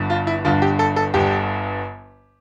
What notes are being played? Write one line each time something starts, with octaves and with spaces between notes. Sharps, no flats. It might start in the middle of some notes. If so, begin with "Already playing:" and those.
Already playing: G1 G2 D3
F4
E4
G1 G2 D3 F4
G4
A4
A4
G1 G2 D3 G4